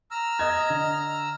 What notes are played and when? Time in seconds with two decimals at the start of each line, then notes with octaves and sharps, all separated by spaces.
0.11 A#5 E6 F6
0.39 D#5 G#6
0.70 D3